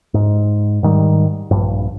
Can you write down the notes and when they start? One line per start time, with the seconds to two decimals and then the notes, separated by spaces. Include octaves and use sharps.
0.14 G#2
0.83 G#2 D#3 G3
1.51 A#1 G2